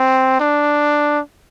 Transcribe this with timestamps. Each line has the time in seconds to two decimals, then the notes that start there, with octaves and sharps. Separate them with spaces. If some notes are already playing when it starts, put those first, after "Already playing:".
Already playing: C4
0.40 D4